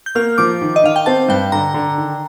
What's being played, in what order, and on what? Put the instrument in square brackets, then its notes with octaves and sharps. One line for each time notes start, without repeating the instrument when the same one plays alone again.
[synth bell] G6
[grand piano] A#3 [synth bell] F6
[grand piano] F3 [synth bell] D6
[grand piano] D#3
[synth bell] D#5
[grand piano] D#3 [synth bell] F5
[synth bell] G5
[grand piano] C4 [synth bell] A5
[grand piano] G2 [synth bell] G5
[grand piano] D3 [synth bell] A#5
[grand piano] D3
D#3